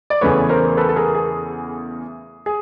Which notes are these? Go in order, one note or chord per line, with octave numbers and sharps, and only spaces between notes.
D5
E2 C#3 E3 A3 B4 C#5
A#4 C5
A4 B4
A4
G#4 A#4
G#4
G#4